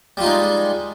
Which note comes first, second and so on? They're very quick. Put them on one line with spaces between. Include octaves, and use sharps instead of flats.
G3 F4 D#4 G#3